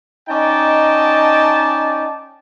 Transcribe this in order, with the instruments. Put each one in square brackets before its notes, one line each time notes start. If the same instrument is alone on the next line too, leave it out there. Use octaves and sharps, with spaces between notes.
[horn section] C#4 D#4 D5 D#5 G5 A5